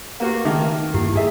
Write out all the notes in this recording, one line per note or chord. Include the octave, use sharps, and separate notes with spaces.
A#3 F#4 G4 B4 F5
D#3 D#4 E5 D6
G2 A#3 E4 G4
G#4 E5